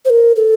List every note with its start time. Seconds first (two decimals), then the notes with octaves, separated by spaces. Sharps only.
0.05 C5
0.10 A#4
0.36 A4